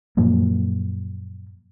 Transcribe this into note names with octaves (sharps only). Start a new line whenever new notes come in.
F#2 A#2 F3 A#3